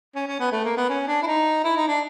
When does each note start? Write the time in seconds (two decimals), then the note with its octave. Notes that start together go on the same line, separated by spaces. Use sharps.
0.15 C#4
0.27 C#4
0.39 B3
0.52 A3
0.64 A#3
0.77 B3
0.89 C#4
1.08 D4
1.23 E4
1.26 D#4
1.64 E4
1.76 D#4
1.88 D4